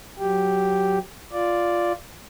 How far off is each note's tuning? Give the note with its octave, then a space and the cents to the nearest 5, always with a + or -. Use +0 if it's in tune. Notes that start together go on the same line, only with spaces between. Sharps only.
F#3 +0 G4 +0
F4 +0 D5 +0